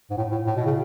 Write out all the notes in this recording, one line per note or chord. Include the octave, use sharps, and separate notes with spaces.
G#2
A2
A2
A2
B2
C#3